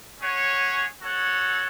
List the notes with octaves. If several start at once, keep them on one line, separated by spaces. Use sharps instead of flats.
C#4 G#4 C#5 F#5
F#4 A4 C#5 F#5